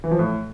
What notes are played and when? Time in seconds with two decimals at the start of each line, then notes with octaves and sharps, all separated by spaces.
0.04 E3
0.11 F3
0.19 A2